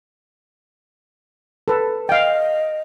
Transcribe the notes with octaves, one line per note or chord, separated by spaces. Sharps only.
A4 B4
D#5 F5 G5